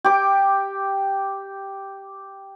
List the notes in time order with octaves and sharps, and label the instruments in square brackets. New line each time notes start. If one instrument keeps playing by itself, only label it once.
[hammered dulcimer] G4 D6